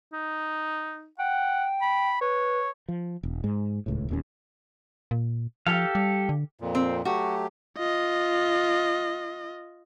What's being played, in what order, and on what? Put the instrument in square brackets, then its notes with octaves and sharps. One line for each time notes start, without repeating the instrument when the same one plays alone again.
[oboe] D#4
[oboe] F#5 [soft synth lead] G5
[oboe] B5
[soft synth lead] B4 [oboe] C#5
[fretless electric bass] F3
E1
G#2 G#3
D#1 C#2 A2
D#1 D#2 C#4
[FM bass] A#2
[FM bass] F3 [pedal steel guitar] G4 A4 F5
[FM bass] G3
D3
[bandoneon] F2 A#2
[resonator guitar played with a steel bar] C4
[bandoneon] F#3 A3 G4 [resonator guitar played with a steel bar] F#4
[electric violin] F4 D#5